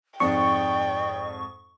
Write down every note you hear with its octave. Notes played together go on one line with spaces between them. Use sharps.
F2 G#2 D5 G5 C#6